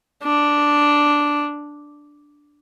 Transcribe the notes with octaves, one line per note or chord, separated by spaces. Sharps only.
D4